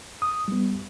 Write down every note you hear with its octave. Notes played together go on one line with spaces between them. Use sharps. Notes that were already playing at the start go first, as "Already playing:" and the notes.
D#6
G3 B3